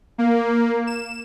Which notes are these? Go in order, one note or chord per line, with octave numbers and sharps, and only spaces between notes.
A#3
E7